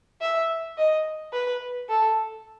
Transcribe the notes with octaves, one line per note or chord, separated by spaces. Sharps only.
E5
D#5
B4
A4